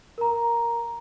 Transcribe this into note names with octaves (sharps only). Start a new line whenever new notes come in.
A#4 A#5